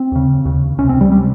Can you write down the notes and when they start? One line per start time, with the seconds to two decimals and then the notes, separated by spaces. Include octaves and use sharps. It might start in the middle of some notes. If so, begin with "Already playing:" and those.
Already playing: C4
0.12 D#2 C#3
0.45 D#2 C#3
0.78 C#2 C3 C#4
0.89 C4
1.01 G3
1.12 C3 G3